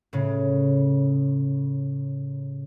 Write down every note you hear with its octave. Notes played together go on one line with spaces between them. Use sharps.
A2 C#3